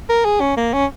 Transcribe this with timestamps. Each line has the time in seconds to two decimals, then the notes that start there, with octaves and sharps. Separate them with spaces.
0.09 A#4
0.25 G#4
0.41 C#4
0.57 A#3
0.73 C#4